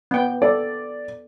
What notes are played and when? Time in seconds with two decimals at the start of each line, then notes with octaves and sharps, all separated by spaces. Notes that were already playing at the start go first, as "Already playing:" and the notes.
0.11 B3 G5
0.42 A4 D5